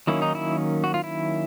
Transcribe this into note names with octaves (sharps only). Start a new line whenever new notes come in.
D#3 F#3 A#3 C#4 E4
D#4
E4
F#4
F4
E4